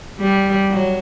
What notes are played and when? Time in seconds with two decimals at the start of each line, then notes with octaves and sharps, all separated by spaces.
0.19 G3
0.71 F#3